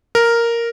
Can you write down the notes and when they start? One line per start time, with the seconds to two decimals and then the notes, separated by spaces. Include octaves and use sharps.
0.15 A#4